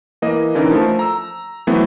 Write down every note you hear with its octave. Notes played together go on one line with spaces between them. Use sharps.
E3 A#3 D#5
D3 E3 C#4 D#4 A4 A#4
F3 A3
A#5 E6
E3 F#3 A3 B3 C4 E4